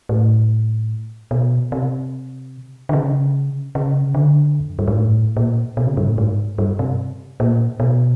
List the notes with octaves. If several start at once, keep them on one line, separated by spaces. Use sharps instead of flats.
A2
B2
C3
D3
C#3
C#3
D3
F2
F#2
G2
G#2
A2
A#2
B2
C#3
G2
A2
G#2
G2
C3
A#2
B2